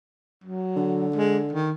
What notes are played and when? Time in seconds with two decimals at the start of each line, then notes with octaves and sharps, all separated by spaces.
0.44 F#3
0.76 D3
1.16 G#3
1.53 D#3